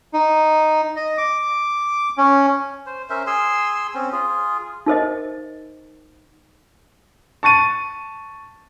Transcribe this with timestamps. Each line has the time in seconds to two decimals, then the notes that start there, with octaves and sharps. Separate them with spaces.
0.14 D#4
0.96 D#5
1.18 D6
2.18 C#4
2.86 C5
3.10 C#4 A#4 C5 E5
3.27 G#4 G#5 C6 E6
3.94 C4 C#4
4.13 F4 G#4
4.86 D#4 A#4 C5 D#5
7.43 A5 C#6 A6 D#7